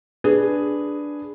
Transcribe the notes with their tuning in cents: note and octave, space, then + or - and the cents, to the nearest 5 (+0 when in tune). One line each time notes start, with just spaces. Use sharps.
D4 +0 G#4 +0 B4 +0